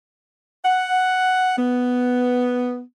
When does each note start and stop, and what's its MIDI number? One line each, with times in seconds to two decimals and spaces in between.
0.65 1.53 78
1.59 2.82 59